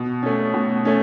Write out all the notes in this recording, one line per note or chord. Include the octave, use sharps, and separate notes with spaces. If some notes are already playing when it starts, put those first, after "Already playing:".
Already playing: B2
A3 C#4
B2
A3 C#4